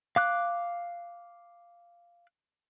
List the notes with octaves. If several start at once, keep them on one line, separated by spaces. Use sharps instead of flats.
F5 D6 F#6